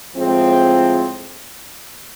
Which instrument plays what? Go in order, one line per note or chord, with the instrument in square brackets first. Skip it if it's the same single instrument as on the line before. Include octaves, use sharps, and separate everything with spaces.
[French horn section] A2 F3 G#3 C4